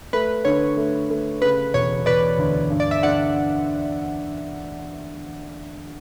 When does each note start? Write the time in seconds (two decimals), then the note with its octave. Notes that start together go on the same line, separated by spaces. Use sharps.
0.13 A3 B4
0.45 D3 C#5
0.77 A3
1.10 A3
1.42 C#3 B4
1.74 E1 C#5
2.06 E1 B4 D5
2.38 D2
2.70 G2
2.80 D5
2.91 E5
3.03 D3 D5 F#5